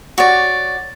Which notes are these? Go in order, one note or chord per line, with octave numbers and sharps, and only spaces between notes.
F#4 C#5 D5